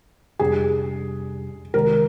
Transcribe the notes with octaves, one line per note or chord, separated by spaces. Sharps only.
F2 C3 G3 D4 G4 G#4
C2 C3 D#3 G#3 A#4